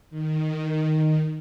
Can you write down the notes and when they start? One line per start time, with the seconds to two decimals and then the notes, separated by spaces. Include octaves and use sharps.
0.10 D#3